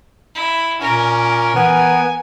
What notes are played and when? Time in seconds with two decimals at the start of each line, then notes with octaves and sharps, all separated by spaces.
0.35 E4
0.81 A#2 C#4 A#4
1.55 E3 B3 G#5